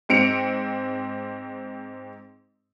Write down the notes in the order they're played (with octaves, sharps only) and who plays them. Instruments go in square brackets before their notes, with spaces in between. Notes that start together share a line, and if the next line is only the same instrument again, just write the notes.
[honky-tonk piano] G#2 C4 C#7 D7 F7